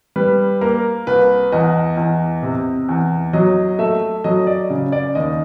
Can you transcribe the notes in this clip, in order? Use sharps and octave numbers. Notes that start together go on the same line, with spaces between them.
G3 B4
A#3 A#4
C2 B4
E2 D#5
E2
C3
E2
F#3 D#5
A3 E5
F#3 D#5
D5
C#3
D5
D#2 D#5